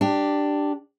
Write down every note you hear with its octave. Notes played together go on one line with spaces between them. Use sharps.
D4 G4